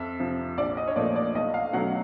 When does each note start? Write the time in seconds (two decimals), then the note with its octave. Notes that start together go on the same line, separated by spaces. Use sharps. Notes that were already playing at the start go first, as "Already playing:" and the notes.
Already playing: F2 E5
0.20 C3 F3
0.58 A#1 D5
0.77 D#5
0.88 C#5
0.96 A#2 F3 A3 D5
1.16 D5
1.35 B1 D#5
1.54 F5
1.73 B2 F#3 A3 C#4 F#5